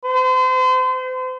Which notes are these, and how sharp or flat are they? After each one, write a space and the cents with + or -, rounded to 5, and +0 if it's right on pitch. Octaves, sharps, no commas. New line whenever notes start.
C5 -35